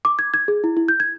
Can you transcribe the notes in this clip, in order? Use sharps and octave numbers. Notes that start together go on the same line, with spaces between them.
D6
G#6
G#6
G#4
E4
E4
G6
G#6